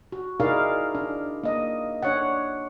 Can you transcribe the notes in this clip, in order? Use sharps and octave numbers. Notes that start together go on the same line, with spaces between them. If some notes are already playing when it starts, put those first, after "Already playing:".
F#4
D#4 E4 G#4 A#4 D5 F5
D4
A#3 D#5
D4 C#5 F#5